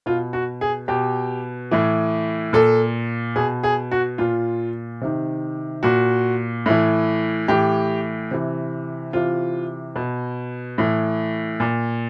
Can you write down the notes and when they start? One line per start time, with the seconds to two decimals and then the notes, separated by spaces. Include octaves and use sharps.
0.06 B2 F4
0.33 F#4
0.61 G#4
0.88 B2 G4
1.71 A2 E3
2.53 A#2 A4
3.36 B2 G#4
3.63 G#4
3.91 F#4
4.18 A#2 F4
5.01 C3 D#3
5.83 A#2 F#4
6.66 A2 E3
7.48 A2 E3 G4
8.31 C3 E3
9.13 C3 E3 F4
9.96 B2
10.78 A2 E3
11.60 A#2